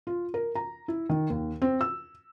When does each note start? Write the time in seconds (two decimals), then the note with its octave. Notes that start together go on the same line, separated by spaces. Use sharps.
0.07 F4
0.34 A#4
0.55 A#5
0.88 E4
1.09 D#3
1.30 D#2
1.62 C4
1.81 E6